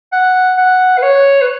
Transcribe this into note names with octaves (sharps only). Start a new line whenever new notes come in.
F#5
F#5
B4
C#5
B4